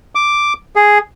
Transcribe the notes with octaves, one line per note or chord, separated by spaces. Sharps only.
D6
G#4